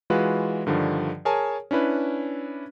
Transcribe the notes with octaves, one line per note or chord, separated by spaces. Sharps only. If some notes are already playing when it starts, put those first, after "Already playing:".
E3 G#3 F4 F#4 B4
G2 D3 D#3 F3
G#4 A#4 C#5 G#5 A5
C#4 D4 E4 B4